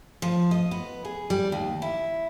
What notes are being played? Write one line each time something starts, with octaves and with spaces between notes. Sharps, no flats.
F3
D#5
B3
G#4
G3
D#2
E4